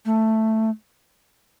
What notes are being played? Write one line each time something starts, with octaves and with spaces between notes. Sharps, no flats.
A3